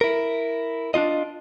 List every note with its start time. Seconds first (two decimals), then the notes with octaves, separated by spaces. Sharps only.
0.01 E4 A#4
0.94 D4 D#4 F4 D#5